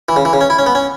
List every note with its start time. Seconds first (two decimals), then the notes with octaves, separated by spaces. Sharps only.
0.09 E3
0.16 C#3
0.25 E3
0.33 C#3
0.41 C#4
0.50 E4
0.58 C#4
0.66 B3
0.75 C#4